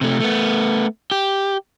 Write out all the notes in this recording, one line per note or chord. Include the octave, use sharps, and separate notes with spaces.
C3 A3
A3 B3
G4